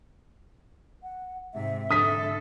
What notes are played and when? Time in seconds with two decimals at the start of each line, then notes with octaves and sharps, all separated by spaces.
1.03 F#5
1.54 G#2 C3 E5
1.91 G#2 D3 A4 D#6 B6